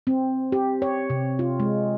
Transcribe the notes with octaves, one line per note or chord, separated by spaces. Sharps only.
C4
G4
C#5
C3
F4
G#3